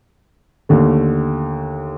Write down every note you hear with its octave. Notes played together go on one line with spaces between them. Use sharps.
D#2 D3 A3